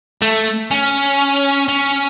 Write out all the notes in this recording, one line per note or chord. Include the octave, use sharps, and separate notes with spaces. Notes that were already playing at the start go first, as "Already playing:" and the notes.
A3
C#4
C#4